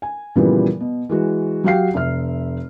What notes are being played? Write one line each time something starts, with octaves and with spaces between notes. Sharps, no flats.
G#5
A#2 C#3 E3 F3 G3 B3
B2
E3 G#3 F#4
F#3 F#4 G4 F5 G5 C7
F1 E5 F6